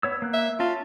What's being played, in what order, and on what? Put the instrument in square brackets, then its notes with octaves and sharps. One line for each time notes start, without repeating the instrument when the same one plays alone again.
[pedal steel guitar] B3 C#5 E6
A#3 F#6
[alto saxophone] E5
[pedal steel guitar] C#4 A5 [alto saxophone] F4